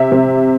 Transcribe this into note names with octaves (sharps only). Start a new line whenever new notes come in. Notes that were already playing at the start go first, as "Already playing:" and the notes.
Already playing: C3 E5
C3